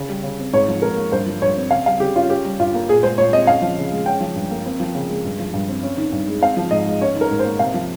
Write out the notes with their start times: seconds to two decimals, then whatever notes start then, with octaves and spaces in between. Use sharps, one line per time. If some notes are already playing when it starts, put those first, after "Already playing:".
Already playing: C#3
0.09 G3
0.23 C#3
0.39 C4
0.53 G#2 C#5
0.68 F3
0.82 G#2 A#4
0.97 A#3
1.12 G2 C5
1.26 F3
1.42 G2 C#5
1.56 C4
1.71 C#3 F5
1.86 G3 F5
2.00 C#3 G4
2.15 C#4 F4
2.30 C#4 G4
2.45 G3
2.60 G2 F4
2.74 A#3
2.89 A#2 G#4
3.03 G#3 C5
3.18 A#2 C#5
3.33 C4 D#5
3.47 C#4 F5
3.62 F3
3.77 C#3
3.92 G#3
4.06 C#4 G5
4.21 F3
4.36 G2
4.51 A#3
4.66 C4
4.80 F3
4.95 C#3
5.09 G#3
5.25 G2
5.39 F3
5.54 G2
5.68 C4
5.83 C#4
5.97 D#3
6.12 G2
6.28 G#3
6.41 C4 F5
6.57 F3
6.71 G#2 D#5
6.87 G#3
7.01 C#4 C#5
7.15 D#3
7.21 A#4
7.31 G#2
7.39 C5
7.45 A#3
7.59 C3 F5
7.74 F3